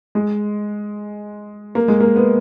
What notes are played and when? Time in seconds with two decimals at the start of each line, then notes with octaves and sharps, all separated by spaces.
0.15 G#3
1.75 A#3
1.88 G#3
2.01 A#3
2.16 B3